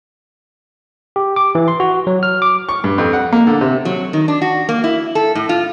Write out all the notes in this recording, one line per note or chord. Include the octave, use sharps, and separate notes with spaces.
G4
D6
E3
C6
F#4
F#3
F6
D6
C#6
G2
F2
F#5
A#3
D3
C3
F#3
D#3
D4
F#4
A#3
E4
A4
A2
F4